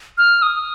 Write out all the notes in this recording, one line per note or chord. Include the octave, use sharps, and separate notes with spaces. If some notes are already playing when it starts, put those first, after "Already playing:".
F6
D#6